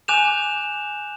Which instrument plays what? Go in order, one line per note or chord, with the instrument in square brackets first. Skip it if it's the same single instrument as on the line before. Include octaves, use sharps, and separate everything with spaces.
[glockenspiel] G#5 D6 F#6 G6 E7 F7